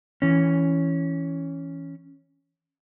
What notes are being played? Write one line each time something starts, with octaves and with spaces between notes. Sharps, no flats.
E3 C#4